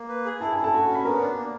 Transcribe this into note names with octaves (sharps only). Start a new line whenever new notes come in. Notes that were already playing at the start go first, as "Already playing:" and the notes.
Already playing: A#3
B4
G#4
E4 A5
E4 G#5
A4 A5
F#4
C#4
B5
B3 A#4 A#5
D4
A#3